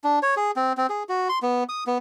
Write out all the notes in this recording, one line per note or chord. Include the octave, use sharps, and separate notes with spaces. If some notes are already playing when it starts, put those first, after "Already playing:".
D4
C#5
G#4
C4
C4
G#4
F#4
C6
B3
D#6
B3